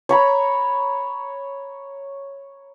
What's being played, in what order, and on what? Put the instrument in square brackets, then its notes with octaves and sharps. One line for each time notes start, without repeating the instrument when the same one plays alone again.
[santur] C#5 A#5 B5